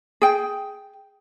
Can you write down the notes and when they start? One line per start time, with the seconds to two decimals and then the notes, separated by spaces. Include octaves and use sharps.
0.22 G#4 G5